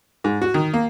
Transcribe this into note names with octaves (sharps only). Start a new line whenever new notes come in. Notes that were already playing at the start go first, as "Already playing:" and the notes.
G#2
F#4
D#3
A#3